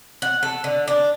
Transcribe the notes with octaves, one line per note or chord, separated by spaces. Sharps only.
F#5
A4
D3
D4